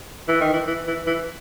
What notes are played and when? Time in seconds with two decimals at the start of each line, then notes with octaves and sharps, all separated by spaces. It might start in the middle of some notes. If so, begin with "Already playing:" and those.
0.28 E3
0.41 D#3
0.53 E3
0.67 E3
0.87 E3
1.07 E3